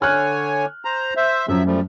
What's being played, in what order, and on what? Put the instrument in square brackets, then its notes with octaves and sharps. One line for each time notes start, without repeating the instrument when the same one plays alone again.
[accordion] D3 C#5 G#5 [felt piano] F6 F#6
[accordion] C5 A#5
C5 E5
[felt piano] F#2 [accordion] F3 F#3 E5
[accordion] F3 G3 A3